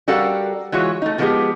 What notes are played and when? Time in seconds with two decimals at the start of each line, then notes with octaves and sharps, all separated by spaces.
0.08 G3 F#4 A4 A#4 F5 F#5
0.72 E3 G#3 F4 F#4 C#5
1.02 A3 D#4
1.18 B2 F3 G#3 B3 G4 G#4